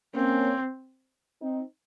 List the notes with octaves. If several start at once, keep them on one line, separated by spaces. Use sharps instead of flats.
A#3 C4 C#4
C4 D#4